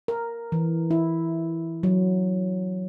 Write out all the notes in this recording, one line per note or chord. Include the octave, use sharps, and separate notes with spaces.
A#4
E3
E4
F#3